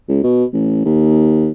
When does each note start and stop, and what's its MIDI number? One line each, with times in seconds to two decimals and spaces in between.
0.09 0.22 37
0.23 0.45 47
0.53 0.81 33
0.85 1.50 39